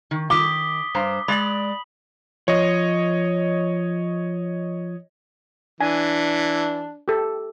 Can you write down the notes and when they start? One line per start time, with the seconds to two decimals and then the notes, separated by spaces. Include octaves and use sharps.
0.11 D#3
0.30 D#3 D6 D#6 B6 G7
0.95 G2 C5 A#5
1.28 G#3 D5 B5 F#7
2.48 F3 C#5 D#5
5.81 E3 D4 G#5
7.08 G4 A4